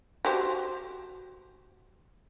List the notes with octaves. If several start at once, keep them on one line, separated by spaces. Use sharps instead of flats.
F#4 G4 C5